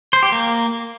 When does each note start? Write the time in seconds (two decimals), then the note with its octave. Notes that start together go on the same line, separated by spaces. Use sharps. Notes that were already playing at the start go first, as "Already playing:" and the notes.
0.13 C5
0.23 G4
0.32 A#3